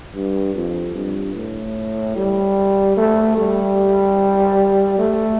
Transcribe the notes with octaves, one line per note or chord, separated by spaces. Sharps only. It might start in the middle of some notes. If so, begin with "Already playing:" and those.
G2
F2
G2
A2
G3
A3
G3
A3